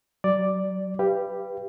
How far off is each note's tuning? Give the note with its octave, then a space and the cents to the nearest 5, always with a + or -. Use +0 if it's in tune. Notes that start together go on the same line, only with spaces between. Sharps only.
F#3 +30 D5 +0
G4 +5 B4 +0 F5 -35